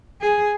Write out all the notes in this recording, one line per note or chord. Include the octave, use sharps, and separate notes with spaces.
G#4